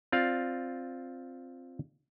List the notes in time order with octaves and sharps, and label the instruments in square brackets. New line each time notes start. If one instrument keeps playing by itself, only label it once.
[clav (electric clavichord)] C4 F4 D5 F5